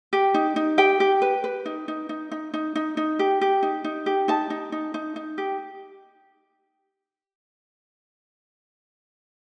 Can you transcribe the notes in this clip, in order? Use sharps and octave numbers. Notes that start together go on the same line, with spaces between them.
G4
D#4
D#4
G4 G5
G4
B4
B4
D#4
D#4
D#4
D#4
D#4
D#4
D#4
G4
G4
D#4
D#4
G4
D#4 A5
D#4
D#4
D#4
D#4
G4